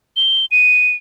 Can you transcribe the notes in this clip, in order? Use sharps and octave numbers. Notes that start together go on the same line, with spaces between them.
G7
D#7